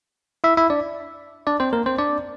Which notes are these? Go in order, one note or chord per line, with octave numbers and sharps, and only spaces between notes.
E4 E5
E4 E5
D4 D5
D4 D5
C4 C5
A#3 A#4
C4 C5
D4 D5